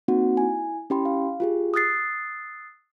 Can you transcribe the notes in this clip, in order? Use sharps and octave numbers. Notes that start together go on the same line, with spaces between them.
A#3 C4 D#4 F#4 F#5
E4 G#5
C#4 E4 G4 G5 B5 C6
F5
F4 G4 G#4
D#6 E6 F#6 A6 C7